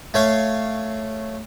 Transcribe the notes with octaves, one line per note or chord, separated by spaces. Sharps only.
A3 C#5 F5